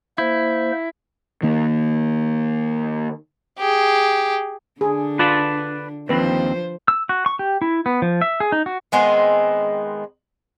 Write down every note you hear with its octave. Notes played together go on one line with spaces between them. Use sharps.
A#3 E4 C5
D#3 A#3
G4 G#4
D3 D4 G#4
F4 B4 D5 A5
D#2 F3 C4 B4 C5
E6
F#4
C#6
G4
E4
B3
F3
E5
G#4
D#4
F#4
D#3 G#3 B3 C4